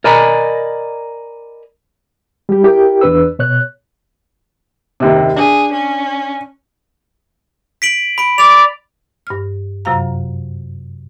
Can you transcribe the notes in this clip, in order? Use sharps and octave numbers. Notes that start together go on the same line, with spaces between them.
A#4 D5 D#5 G#5 A#5 B5
G3 G4
E4 G4 A#4 G5
E2 D4 B4 E6
B2 C#5 F#6
F#1 D#2 C3
D4 G#4
C#4
B6 D7 F#7
B5 D7
D5 F7
G2 F6
F#2 C3 F#3 F4 F5 A#5